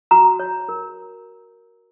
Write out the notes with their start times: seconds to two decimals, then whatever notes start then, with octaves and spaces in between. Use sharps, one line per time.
0.11 F#4 A#5
0.39 C#5
0.69 A#4